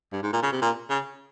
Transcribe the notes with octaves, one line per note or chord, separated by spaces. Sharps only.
G2
G#2
A#2
C#3
C3
A#2
C#3